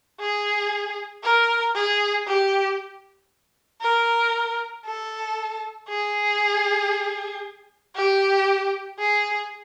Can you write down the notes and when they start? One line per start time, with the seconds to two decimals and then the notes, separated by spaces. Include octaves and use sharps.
0.20 G#4
1.24 A#4
1.75 G#4
2.27 G4
3.82 A#4
4.86 A4
5.89 G#4
7.96 G4
8.99 G#4